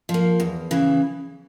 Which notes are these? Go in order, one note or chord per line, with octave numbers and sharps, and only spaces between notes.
F3
A#3
E2
C#3 E3